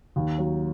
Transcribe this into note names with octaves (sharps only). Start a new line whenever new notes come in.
D#2
F#3